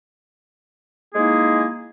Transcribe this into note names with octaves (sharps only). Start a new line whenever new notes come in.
G#3 A#3 D#4 E4 G#4